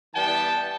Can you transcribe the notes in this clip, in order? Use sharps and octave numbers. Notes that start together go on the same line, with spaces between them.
E3 G3 B3 G5 A5